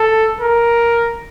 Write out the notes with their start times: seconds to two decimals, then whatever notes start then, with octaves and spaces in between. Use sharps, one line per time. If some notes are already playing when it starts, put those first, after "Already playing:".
Already playing: A4
0.41 A#4